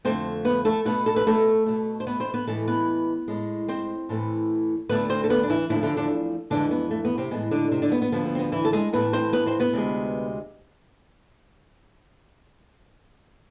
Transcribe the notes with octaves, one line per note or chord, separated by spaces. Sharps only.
F2 D3 A3 C4 C5
B3 B4
A3 A4
B2 A3 B3 B4
A4
B4
A3 A4
B2 A3
C5
B3 B4
C4 C5
B3 B4
A2 E3 G#3 A3 A4
B3 B4
A2 G#3
C4 C5
A2 E3 A3
D2 D3 A3 B3 B4
C4 C5
A4
B3 B4
D4
E3 E4
E2 D3 E3 F3 A3 E4
D3 D4
D3 D4
F2 D3 E3 G#3 D4
B3
A3
B3
C3 C4
A2 E3 G#3 B3
D3 D4
C3 C4
D3 D4
B3
B3
D2 D3 F3 B3
B3
C4
B3
E3 E4
A4
G#3 G#4
A2 E3 A3 B3 B4
C4 C5
B3 B4
C4 C5
B3 B4
D2 C3 G#3